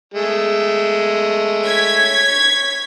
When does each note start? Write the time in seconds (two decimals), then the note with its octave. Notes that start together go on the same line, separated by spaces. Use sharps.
0.14 G#3 A3
1.66 C#5 G#6 B6